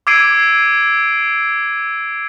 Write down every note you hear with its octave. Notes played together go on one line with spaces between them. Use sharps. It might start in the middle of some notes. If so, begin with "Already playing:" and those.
D6 E6 G#6 C7 D7 D#7